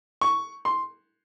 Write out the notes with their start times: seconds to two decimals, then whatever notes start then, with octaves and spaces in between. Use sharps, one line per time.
0.21 C#6
0.65 C6